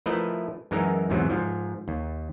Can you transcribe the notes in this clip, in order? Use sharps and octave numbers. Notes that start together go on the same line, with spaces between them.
F3 A3 E4 A#4 B4 D#5
F#2 E3 G#3 D#4 A#4
E2 G#2 C3 E3 F#3
G#2 F3
D#2